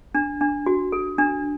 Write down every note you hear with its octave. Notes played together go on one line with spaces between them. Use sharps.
D4
D4
F#4
A4
D4